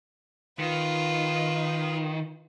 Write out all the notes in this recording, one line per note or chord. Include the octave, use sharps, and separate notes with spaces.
D#3 F4 B4